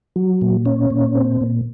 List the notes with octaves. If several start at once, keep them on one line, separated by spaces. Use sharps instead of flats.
F#3
A#2
C#4
A#2
C4
A#2